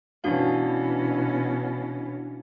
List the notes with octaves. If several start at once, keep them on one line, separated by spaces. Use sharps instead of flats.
B2 E3 C#4 D4 F#4 F5